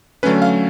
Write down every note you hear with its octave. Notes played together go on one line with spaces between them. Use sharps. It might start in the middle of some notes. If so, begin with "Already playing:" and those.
D3 F#3 A3 C#4 B4
F5